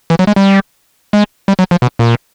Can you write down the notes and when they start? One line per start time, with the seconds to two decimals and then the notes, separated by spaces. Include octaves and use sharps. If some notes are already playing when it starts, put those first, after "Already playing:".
0.10 E3
0.19 F#3
0.27 G#3
0.36 G3
1.13 G#3
1.48 G3
1.59 F#3
1.71 F3
1.82 B2
1.99 A#2